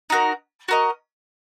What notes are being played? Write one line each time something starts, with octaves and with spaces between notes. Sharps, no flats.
D#4 F#4 A#4
F#4 A#4 D#5